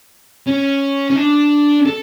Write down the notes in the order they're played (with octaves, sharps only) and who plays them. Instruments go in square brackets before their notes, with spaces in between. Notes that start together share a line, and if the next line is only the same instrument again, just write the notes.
[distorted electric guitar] C#4
C#4
D4
A4